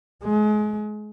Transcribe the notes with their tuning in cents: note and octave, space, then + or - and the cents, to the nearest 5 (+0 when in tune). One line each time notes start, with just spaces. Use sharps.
G#3 +30